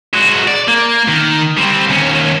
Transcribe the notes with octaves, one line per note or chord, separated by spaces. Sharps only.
G#3 F#4
D5
A#3
D#3
G3 C4
D#2 C#4